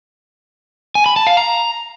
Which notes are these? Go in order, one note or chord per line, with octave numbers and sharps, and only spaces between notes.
G#5
B5
A5
F5
A#5